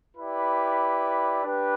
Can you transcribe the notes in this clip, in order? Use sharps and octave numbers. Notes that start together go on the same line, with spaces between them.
E4 G4 B4 D5
D4 G4 B4